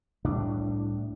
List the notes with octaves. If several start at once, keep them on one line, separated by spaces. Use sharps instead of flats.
C2 A2 D4